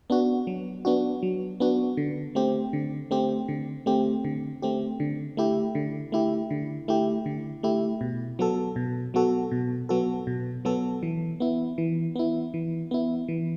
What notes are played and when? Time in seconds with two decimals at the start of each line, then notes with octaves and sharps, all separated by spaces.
0.10 B3 D4 F#4
0.47 F#3
0.85 B3 D4 F#4
1.23 F#3
1.60 B3 D4 F#4
1.97 D3
2.35 A3 C4 G4
2.73 D3
3.11 A3 C4 G4
3.48 D3
3.86 A3 C4 G4
4.25 D3
4.62 A3 C4 G4
5.00 D3
5.37 A3 E4 G4
5.75 D3
6.12 A3 E4 G4
6.51 D3
6.88 A3 E4 G4
7.26 D3
7.63 A3 E4 G4
8.01 B2
8.39 F#3 B3 F#4 A4
8.76 B2
9.14 F#3 B3 F#4 A4
9.51 B2
9.89 F#3 B3 F#4 A4
10.27 B2
10.65 F#3 B3 F#4 A4
11.03 E3
11.40 B3 E4
11.78 E3
12.16 B3 E4
12.54 E3
12.91 B3 E4
13.28 E3